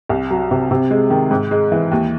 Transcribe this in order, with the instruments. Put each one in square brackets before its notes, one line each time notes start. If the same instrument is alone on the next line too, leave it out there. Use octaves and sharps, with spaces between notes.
[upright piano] C2
F#3
C3
C3
G#3
D#3
G#2
G#3
E3
D#2